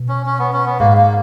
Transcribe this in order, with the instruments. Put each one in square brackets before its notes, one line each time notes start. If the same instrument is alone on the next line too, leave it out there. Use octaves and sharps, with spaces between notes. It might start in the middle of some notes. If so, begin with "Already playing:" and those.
Already playing: [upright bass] B2
[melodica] C#4
C#4
B3
C#4
B3
[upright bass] G#2 [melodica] A#3
[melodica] A#3